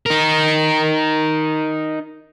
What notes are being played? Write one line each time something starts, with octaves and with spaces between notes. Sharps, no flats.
D#4 A#4